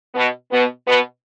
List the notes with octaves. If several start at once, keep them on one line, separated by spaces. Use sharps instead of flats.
B2 B3
B2 B3
B2 B3